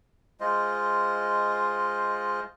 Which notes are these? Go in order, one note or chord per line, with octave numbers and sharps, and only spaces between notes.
G#3 F4 C5 D#5